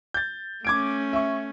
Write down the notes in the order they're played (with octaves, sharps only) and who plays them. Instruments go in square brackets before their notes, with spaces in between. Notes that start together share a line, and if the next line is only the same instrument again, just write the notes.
[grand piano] G6 A6
[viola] A3 C#4 [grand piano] D6 G#6 D7
[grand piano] E5 C#6